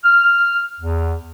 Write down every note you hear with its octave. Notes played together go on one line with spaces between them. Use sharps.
F6
E2